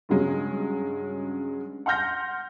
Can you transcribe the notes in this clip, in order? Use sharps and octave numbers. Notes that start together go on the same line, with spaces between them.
G2 C#3 F#3 G#3 C#4
F#5 C6 F6 G6 A#6